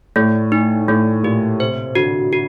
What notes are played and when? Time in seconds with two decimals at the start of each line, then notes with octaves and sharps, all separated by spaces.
0.16 A2 A3
0.52 D#4
0.88 A2 A3
1.23 A#2 G4
1.60 C3 C5
1.95 D3 F#4
2.33 F#4